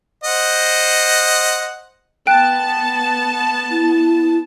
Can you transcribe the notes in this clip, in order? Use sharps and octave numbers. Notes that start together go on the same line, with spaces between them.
C5 D#5 F#5
B3 G5 A5 F#6
E4